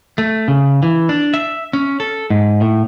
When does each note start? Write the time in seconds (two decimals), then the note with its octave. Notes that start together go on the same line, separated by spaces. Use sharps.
0.18 A3
0.48 C#3
0.83 E3
1.09 D4
1.34 E5
1.73 C#4
2.00 A4
2.30 G#2
2.61 A2